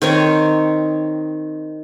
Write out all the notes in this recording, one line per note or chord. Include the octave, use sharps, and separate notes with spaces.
D#3 C4 C#5